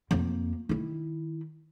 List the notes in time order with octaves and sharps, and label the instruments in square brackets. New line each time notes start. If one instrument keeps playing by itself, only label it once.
[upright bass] F2 A#3
D#3 E4